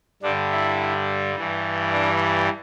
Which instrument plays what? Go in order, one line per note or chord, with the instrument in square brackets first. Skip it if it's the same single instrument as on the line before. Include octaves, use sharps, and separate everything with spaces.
[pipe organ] G2 D3 G3 D4
E4
G2 E3 G3
D4